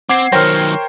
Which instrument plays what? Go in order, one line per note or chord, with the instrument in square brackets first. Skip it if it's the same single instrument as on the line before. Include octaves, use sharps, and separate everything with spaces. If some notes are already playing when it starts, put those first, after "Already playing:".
[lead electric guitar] C4 [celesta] F#5 [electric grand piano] D6 G#6 C7
[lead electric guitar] D#3 F#3 [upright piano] A#4 G5 [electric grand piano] C5 C#5 [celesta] F6 A#6